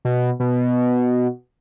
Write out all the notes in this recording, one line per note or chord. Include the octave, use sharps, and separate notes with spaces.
B2
B2